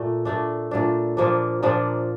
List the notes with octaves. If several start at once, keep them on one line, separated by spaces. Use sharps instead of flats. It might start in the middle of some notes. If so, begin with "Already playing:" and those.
Already playing: A#2 A3
A#2 A3 D4
A#2 A3 D4
A#2 F3 A#3 D4
A#2 F3 A#3 D4